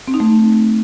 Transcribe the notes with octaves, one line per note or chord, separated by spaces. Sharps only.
C4
D#4
A3